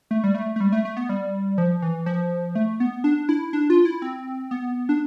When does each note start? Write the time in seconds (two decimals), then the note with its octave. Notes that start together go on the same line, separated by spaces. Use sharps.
0.11 A3
0.24 G3
0.35 A3
0.56 A3
0.60 G3
0.72 A3
0.85 A3
0.97 B3
1.09 G3
1.58 F3
1.82 E3
2.06 F3
2.55 A3
2.80 B3
3.04 D4
3.29 E4
3.53 D4
3.70 F4
3.85 E4
4.02 C4
4.51 B3
4.89 D4